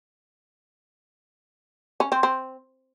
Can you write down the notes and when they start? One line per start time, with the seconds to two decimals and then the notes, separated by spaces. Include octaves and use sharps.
2.00 C#4
2.12 C4
2.23 C4